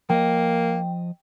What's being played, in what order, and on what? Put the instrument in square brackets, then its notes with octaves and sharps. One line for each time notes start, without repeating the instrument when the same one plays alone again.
[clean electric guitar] F3 D#5 [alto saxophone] A#3 [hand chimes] G5